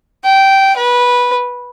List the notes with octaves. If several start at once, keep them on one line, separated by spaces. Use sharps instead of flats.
G5
B4